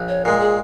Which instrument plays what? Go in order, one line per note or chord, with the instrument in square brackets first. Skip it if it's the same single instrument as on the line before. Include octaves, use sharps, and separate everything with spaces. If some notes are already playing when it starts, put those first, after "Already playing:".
Already playing: [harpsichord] A#1
[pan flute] C#5
[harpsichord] A#2 G#3 [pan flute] A#4
[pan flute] G#4